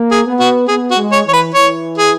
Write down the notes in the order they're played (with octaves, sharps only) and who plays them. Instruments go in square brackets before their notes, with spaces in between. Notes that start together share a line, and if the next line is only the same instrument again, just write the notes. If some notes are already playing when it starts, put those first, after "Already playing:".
Already playing: [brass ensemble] A#3
[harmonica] G#4
[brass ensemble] B3
[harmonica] F#4
[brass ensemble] B3 [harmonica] G#4
[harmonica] F#4
[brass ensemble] G#3
[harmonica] C#5
[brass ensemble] E3 [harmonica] C#5
[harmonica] B4
[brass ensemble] E3 [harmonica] C#5
[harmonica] G#4